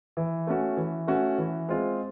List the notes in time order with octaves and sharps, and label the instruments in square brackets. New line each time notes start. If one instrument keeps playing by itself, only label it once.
[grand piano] E3
A3 C#4 F#4
E3
A3 C#4 F#4
E3
G#3 C4 F4